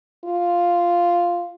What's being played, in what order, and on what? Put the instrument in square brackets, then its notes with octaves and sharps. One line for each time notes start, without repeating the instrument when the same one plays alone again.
[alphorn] F4